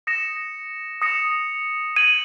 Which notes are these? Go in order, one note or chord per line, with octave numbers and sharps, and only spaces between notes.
D#6 A#6 C#7 E7
D#6 A#6 C#7 E7
G#6 D#7 F#7